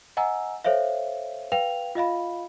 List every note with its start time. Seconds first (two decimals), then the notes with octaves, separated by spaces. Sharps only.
0.17 D#5 F#5 G#5 A#5 E6
0.64 A4 C5 C#5 E5 F5
1.52 B4 F5 G5 F7
1.95 F4 D#5 F5 B5